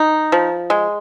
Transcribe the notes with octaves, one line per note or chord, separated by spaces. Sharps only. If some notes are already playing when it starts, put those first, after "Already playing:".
Already playing: D#4
F3
G#3